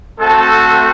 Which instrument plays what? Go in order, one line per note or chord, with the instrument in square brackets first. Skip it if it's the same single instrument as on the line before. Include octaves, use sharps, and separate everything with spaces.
[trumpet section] A3 C4 F#4 A4